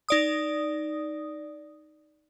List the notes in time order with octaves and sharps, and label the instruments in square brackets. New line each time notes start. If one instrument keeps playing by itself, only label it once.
[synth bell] D#4 D5 D#6